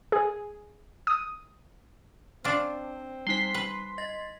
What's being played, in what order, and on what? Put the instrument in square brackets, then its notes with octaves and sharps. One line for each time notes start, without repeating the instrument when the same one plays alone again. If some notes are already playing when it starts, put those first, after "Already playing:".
[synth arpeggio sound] G#4
D#6
[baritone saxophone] C4 [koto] D4 F4
[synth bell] G3 D#4 [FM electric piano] C6 B6
[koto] B4
[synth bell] D#5 A6 A#6